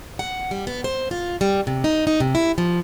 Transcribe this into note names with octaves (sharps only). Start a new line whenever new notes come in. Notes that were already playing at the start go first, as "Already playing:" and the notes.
F#5
G3
B3
C5
F4
G3
C3
D#4
D#4
C3
E4
F3